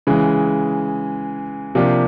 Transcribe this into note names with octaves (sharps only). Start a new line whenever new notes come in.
C#3 E3 G#3
C3 F3 A#3 D4 G4